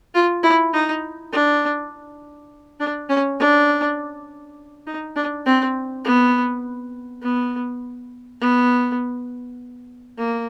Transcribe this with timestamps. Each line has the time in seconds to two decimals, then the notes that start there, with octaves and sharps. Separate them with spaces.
0.14 F4
0.43 E4
0.73 D#4
1.32 D4
2.80 D4
3.09 C#4
3.39 D4
4.87 D#4
5.16 D4
5.46 C4
6.05 B3
7.22 B3
8.41 B3
10.18 A#3